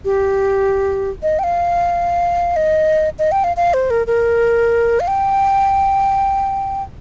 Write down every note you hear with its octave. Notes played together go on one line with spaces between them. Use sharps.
G4
D#5
G5
F5
D#5
D#5
G5
F5
F5
C5
A#4
A#4
F5
G5